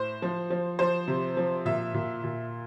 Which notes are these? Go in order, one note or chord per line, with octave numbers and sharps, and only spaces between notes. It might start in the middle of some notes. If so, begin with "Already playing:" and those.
Already playing: A2 C5
F3
F3
F3 C5
C3
F3
A#2 E5
A#2
A#2